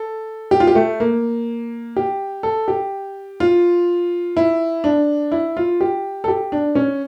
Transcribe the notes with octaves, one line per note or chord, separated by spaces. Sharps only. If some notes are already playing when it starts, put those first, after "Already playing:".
Already playing: A4
G4
F4
G4
A3
A#3
G4
A4
G4
F4
E4
D4
E4
F4
G4
A4
G4
D4
C#4